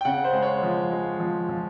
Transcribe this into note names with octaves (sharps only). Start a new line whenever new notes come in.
G5
C#3 F#5
C5
G#3
C#5
F3
G#3
F3
F3